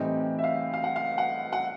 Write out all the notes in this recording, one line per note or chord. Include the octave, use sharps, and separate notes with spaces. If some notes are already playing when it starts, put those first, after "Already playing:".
Already playing: A2 E3 G3 C4 D#4 G5
E5
F5
F5
F#5
F5
F#5
F#5